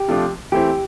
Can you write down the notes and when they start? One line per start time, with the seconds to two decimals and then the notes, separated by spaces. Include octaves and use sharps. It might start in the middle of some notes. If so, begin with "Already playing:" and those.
Already playing: G4
0.08 C3 F3 A3 D4 F4
0.52 E3 A3 C4 E4 G4